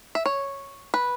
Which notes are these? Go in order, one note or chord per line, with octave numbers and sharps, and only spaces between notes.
E5
C#5
B4